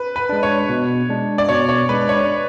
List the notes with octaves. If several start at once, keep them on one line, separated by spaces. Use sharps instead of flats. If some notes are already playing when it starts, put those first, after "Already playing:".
Already playing: B4
B4
G#3 D4
C#5
B2
G#3 D4
D5
B2 C#5
C#5
G#3 D4 B4
C#5